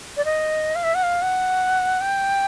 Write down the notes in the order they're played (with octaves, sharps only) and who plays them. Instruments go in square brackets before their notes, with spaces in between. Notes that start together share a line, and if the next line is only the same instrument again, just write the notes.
[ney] D5
D#5
F5
E5
F#5
F5
F#5
G5